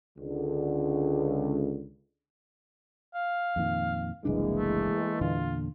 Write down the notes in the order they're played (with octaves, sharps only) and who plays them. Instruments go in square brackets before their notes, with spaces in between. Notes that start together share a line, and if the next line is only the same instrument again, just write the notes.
[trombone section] C#2 D3
[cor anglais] F5
[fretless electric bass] F2 A#2 D#3
[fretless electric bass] F#1 C2 D4 [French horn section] E3 G#3 A#3
[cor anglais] A3
[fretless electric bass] E2 A#2 D3 [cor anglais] F4